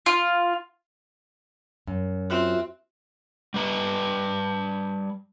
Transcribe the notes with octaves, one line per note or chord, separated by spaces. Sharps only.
F4
F#2
C4 F4 F#4 E5
G3 B4 A#5